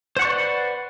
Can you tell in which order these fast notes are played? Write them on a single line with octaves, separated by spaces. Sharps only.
C5 F#5 C#6 D5 B4